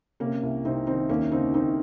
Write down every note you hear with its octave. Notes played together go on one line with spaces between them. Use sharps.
C3 A#3 C#4
C2
C2 C4 D#4
D#3 C4 D#4
D#2 A#3 C#4
C#3 C4 D#4
D#2 C4 D#4